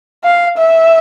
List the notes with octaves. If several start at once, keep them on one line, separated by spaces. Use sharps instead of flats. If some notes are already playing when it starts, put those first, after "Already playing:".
F5
E5